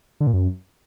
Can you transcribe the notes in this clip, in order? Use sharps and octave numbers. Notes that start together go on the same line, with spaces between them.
D3
A#2
F#2